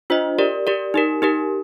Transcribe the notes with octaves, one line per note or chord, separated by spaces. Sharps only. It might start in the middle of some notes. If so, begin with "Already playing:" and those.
D4 F4 C5 D#5
G4 A#4 D5
G4 A#4 D5
D#4 G4 A#4
D#4 G4 A#4